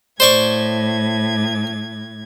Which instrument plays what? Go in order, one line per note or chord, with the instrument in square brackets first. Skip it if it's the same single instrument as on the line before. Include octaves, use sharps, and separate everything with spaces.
[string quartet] A2 G#6 [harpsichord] C5 D5 C#6